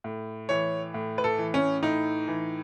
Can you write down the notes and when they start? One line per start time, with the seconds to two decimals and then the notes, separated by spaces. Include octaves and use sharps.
0.04 A2
0.49 E3 C#5
0.94 A2
1.18 B4
1.24 A4
1.38 E3
1.54 C#4
1.83 A2 D#4
2.28 E3